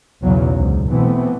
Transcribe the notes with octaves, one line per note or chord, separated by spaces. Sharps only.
B1 E2 C#3 F#3
C#2 G#2 D3
B2 E3 A3 B3 C4